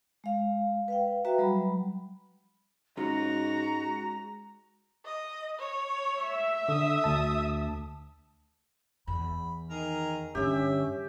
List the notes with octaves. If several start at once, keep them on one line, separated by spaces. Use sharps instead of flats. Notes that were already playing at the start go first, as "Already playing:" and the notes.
G#3 F5
B4 F5 G5
F#4 B4 E5 G5 A#5
F#3 G3 B5
G#2 G#3 C#4 F4 F#4 A#5
D#5
C#5
E5
D3 D#6
D2 A5
E2 B5
D#3 G#4 A#4 A#5
G2 D3 C#4 G4 E5